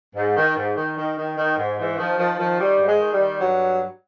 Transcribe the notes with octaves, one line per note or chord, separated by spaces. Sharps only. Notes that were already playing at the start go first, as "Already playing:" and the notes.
G#2
D#3
G#2
D#3
D#3
D#3
D#3
G#2
G#2 E3
D#3 F3
D#3 F3
D#3 F3
D#3 G3
G#2
G#3
D#3
G3
D#3
G2 F#3